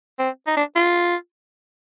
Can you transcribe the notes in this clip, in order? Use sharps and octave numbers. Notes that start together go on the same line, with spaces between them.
C4
D#4
D4
F4